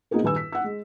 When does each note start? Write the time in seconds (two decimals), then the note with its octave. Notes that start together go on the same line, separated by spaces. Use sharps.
0.11 A#3 B3 D#4 F4 G#4 A#4
0.23 D#1 G2 B4 G#5 E6
0.36 B6
0.52 F#5 E6
0.64 G#3